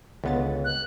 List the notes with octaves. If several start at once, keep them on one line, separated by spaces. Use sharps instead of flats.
C#2 D3 B3 A6
F#6